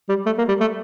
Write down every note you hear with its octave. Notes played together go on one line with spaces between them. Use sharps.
G3
A3
A#3
G3
A3